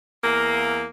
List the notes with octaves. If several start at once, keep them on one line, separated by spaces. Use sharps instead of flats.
E2 A#3